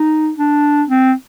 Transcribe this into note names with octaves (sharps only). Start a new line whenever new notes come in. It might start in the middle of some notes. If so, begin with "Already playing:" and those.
Already playing: D#4
D4
C4